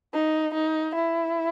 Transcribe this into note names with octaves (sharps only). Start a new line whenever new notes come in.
D#4
D#4
E4